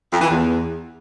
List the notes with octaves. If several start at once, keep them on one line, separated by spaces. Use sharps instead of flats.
F2
E3
E2